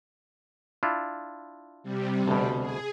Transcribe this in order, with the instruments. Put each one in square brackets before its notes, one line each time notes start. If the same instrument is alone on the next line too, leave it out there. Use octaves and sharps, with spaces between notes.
[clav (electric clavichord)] D4 E4 F4
[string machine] C3 G3
[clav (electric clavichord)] D2 B2
[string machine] G#4